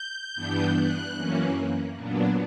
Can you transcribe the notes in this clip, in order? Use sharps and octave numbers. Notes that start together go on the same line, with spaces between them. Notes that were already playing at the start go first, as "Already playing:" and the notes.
Already playing: G6
G2 E3 B3 D4
F#6
F#2 E3 A#3 C#4
A#2 F#3 B3 D4